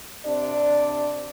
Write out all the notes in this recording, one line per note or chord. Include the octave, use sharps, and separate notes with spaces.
C3 D4 D5